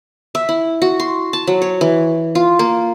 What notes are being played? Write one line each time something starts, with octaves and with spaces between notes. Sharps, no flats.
E5
E4
F#4
C6
A5
F#3
C#5
E3
F4
A#3